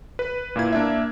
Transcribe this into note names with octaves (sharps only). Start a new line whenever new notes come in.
B4
A#2 A#3 E4 G#6
A#3 D4 E5